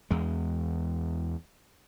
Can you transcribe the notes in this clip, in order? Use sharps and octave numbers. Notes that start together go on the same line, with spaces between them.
E2 G#3